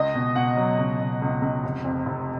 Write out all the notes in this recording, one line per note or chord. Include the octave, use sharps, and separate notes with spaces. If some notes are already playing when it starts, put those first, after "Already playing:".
Already playing: C#2 D#5
B2
B2 F#5
F#3
C#2
B2
C#2
C#2
F1
F2
F1